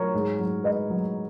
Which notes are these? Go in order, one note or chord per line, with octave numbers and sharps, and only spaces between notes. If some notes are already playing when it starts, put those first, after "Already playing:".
Already playing: F#3 A#4 C#5
G#2
F#3
G#2 B4 D#5
F#3